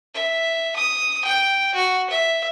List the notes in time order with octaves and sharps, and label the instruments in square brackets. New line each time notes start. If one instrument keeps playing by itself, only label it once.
[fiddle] E5
D#6
G5
F#4
E5